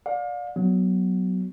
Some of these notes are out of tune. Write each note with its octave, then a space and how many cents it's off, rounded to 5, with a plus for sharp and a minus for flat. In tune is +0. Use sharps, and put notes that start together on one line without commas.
D5 +0 F5 +35
F#3 +5 B3 +0